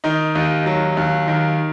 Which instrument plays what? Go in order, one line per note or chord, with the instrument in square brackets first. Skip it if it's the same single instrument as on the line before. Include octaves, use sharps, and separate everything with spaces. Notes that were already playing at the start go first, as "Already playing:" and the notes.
[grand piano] D#3 D#4
D#2
F#3
D#2
D#3